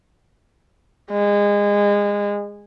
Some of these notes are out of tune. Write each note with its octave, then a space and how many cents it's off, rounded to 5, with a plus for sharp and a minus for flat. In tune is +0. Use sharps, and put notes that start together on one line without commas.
G#3 -25